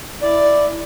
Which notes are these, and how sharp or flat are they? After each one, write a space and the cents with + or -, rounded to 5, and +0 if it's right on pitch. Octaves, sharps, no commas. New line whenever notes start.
E4 +0 D5 +0